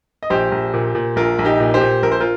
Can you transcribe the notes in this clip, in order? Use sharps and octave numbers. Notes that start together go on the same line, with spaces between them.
D#5
A#1 G4 C5
A#1
A#2
A#2
A#1 F4 A#4
A#1
D#4 G4
A#2
G4 C5
A#2
A#1 A#4
C5
F4 A#4